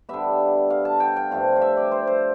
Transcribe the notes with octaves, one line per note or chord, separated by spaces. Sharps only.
D3 G3 B3 E5
F5
A5
G5
G5
G2 F3 A3 C4 F5
F5
E5
D5
C5
C5